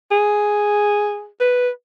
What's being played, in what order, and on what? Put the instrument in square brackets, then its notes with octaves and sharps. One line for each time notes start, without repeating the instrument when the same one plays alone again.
[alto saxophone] G#4
B4